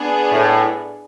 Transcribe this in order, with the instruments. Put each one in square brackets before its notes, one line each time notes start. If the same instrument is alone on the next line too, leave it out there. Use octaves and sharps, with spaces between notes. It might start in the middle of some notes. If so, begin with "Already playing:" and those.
Already playing: [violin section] B3 D4 G#4
[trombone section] A2